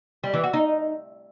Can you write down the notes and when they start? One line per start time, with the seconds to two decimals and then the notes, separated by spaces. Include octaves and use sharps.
0.24 G3
0.34 E3
0.44 F#4
0.54 D#4